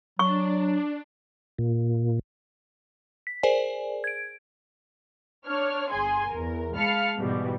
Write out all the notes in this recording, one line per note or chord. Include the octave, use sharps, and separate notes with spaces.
F#3 D4 C#6
A#2
B6
G#4 A#4 C5 D5 G#5
G#6 D7
D4 C#5 F6
G1 G#4 G#5 C6
E2 A#4
G#3 F5 A5 B5 F6 C#7
G#2 B2 E3 G3